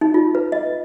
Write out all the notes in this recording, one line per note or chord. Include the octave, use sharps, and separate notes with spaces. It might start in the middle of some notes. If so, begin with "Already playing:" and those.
D#4
F4
B4
D#5